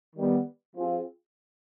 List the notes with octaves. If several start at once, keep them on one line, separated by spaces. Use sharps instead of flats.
D#3 G3 B3
F3 C4 F4 G#4